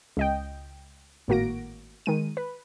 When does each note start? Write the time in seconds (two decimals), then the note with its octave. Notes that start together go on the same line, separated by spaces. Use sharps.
0.17 C#2 D#5 G5
1.28 G#1 A2 A#3 F#4 A#6 D7
2.06 D#3 G#3 D#7
2.37 B4